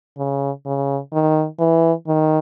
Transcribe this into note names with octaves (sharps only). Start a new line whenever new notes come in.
C#3
C#3
D#3
E3
D#3